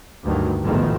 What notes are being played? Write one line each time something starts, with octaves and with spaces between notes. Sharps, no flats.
D2 G2 D#3 F#3
A1 E2 G#2 B2 D#3 F3